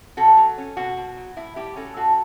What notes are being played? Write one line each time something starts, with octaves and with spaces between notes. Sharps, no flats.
B2 F#4 A4
F#3
C#4
B2 F#4
B2
F#3
A2 E4
G3 E4 G4
C#4 F#4 A4
A2 F#4 A4